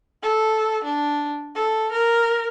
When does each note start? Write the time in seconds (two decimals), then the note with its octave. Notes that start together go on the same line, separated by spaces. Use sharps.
0.23 A4
0.84 D4
1.55 A4
1.91 A#4